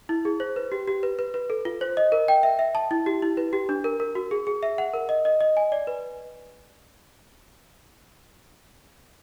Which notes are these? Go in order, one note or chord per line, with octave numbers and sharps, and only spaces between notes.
E4
G#4
C5
B4
G4
G4
B4
B4
B4
A4
F4
C5
D#5
A#4
G5
E5
E5
A5
E4
G4
E4
B4
G4
D4
A#4
A#4
F#4
G#4
G#4
E5
F#5
A#4
D#5
D#5
D#5
G#5
D5
B4